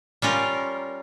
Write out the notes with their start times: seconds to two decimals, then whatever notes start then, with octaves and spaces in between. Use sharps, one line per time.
0.22 G3 C#4 F4 A#4